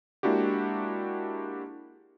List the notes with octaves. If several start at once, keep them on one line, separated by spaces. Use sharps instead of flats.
G#3 A#3 D4 E4 F#4 G4